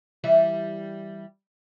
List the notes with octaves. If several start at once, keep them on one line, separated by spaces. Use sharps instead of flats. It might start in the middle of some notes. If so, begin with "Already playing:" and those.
E3 G3 E5